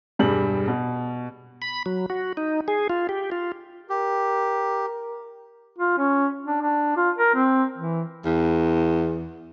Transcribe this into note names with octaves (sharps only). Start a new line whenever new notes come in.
E1 G2 G3 D4 G#4 F#7
B2
B5
F#3
F#4
D#4
G#4
F4
G4
F4
G4 A#4
F4
C#4
D4
D4
F4
A#4
C4
E3
E2